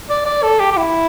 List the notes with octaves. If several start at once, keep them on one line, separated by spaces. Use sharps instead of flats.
D5
D5
A4
G4
G4
E4